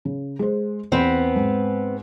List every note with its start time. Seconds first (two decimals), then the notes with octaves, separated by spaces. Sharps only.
0.05 C#3
0.39 G#3 C5
0.92 E2 B3 C4 B4
1.36 G#2